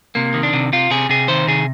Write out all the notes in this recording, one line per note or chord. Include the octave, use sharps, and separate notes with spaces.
C3 A#3
D#3
D4
C3
C3 F4
C3 G#4
C3 G#4
D#3 C5
C3 G#4